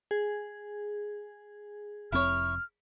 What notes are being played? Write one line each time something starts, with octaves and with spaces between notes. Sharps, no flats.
G#4
F1 F2 C4 E4 C#5 F6